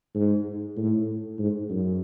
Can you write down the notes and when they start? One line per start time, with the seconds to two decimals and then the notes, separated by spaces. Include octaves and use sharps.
0.15 G#2
0.77 A2
1.39 G#2
1.70 F#2